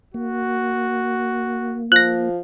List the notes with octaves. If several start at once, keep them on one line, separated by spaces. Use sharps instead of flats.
A#3 F#4
F3 F#6 A#6